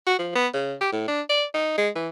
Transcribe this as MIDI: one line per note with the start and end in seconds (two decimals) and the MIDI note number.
0.07 0.16 66
0.19 0.33 53
0.35 0.47 59
0.54 0.75 49
0.81 0.89 67
0.92 1.03 45
1.08 1.21 62
1.30 1.45 74
1.54 1.75 63
1.78 1.89 56
1.96 2.09 52